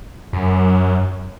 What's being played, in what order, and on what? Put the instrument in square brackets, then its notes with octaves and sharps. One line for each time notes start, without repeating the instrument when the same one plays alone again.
[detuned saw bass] F#2